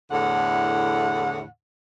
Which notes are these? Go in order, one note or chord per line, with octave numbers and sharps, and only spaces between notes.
E2 A2 D3 F#5